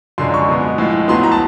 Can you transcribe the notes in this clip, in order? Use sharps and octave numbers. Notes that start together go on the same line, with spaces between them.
F#2 D3 F3 G#3 C6
C#6
B2 G#3 B3
A2 F3 G#3
A2 F#3 B3 C6
A#5
A5